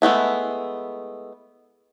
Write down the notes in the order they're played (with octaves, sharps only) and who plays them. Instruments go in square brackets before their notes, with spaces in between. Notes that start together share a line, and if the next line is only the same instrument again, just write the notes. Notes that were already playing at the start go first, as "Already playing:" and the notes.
[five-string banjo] G#3 A3 B3 E4